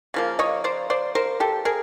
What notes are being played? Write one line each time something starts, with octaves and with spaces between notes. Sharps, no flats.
C#3 F3 A#3
C#5 D#5
C5 D5
C5 D5
A#4 C5
G4 A4
G#4 A#4